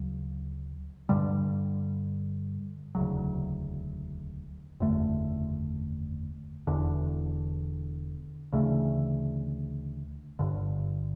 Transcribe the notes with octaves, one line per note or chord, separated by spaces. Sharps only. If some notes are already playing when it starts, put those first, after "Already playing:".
Already playing: D2 C#3 F#3
G2 D3 G3
E1 D2 C#3 F#3
F#1 E2 D3 A3
E1 E2 D3
D2 C#3 E3 A3
G1 G2 D3